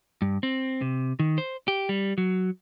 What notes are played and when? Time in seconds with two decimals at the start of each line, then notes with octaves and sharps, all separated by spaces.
0.22 G2
0.43 C4
0.81 C3
1.19 D#3
1.38 C5
1.68 G4
1.89 G3
2.18 F#3